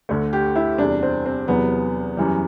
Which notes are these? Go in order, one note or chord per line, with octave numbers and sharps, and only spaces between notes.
D2 D3 A3
G4
E4
E2 C3 G3 D4
C4
C4
E2 C3 F#3 B3
F#2 E3 G3